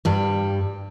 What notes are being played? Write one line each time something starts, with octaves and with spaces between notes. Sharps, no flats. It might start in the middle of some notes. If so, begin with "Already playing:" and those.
G2 G3